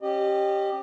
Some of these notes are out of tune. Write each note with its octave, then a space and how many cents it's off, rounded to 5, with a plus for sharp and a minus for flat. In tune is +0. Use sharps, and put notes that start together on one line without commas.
C#4 -25 G4 +0 D#5 -30